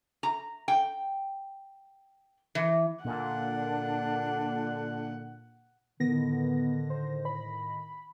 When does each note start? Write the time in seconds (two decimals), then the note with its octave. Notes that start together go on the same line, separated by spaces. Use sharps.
0.23 A#5
0.68 G5
2.55 E3
3.05 A#2 D3 D4 F#5
6.00 A2 D3 D#3 B3 A#6
6.90 C5
7.25 B5